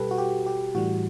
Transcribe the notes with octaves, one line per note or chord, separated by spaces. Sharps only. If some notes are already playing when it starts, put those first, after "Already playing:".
Already playing: B2 G3 G4 A4 B4
F#4
G4
G4
A2 E3 G3 F#4